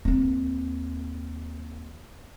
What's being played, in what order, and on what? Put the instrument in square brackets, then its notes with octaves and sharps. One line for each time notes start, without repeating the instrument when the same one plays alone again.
[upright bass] D#2 C4